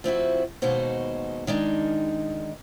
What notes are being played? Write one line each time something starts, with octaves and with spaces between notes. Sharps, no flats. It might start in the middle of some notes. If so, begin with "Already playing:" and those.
F3 C4 E4 F#4
D#2 B2 G#3 D#4 F#4 C5
D#3 G#3 D4 D#4